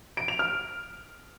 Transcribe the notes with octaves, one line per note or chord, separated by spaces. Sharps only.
D7
F7
F6